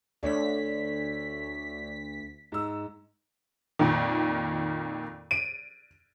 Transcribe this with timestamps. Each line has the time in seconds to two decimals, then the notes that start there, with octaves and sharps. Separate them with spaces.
0.23 D2 A3 D4 C#5 B6
2.52 G#2 E6
3.79 F2 A#2 D#3
5.31 D7 D#7